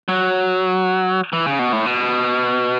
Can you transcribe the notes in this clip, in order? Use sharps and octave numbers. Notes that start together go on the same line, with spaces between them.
F#3
E3
C#3
B2
A2
B2